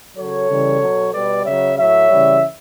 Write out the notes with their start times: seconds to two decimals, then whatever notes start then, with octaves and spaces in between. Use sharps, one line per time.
0.17 C#3 F#3 A4 C#5
0.49 C#3 E3 G3
0.81 B2 F#3
1.13 B2 G3 B4 D5
1.45 C#3 F#3 C#5 E5
1.77 A2 F#3 C#5 E5
2.09 C#3 E3 G3